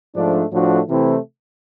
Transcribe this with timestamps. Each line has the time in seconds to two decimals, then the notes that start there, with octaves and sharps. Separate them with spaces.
0.16 G#2 F3 A3 D4
0.53 A2 F3 A3 D4 F#4
0.88 C3 E3 A3 C4 E4